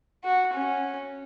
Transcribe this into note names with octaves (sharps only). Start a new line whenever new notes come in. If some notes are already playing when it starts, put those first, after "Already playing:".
F#4
C#4